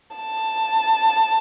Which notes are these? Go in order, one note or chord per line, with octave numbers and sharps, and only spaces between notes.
A5